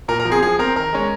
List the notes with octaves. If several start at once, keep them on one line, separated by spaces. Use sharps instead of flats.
A#2 A#4
A#4
F3
C4 G#4
F3 G#4
C4 A#4
D#3 A#4
G#3 C#4